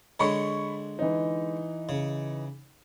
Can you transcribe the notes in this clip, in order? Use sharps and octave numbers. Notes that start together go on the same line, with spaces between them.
D3 G#3 C#5 B5 C#6
E3 D#4
C#3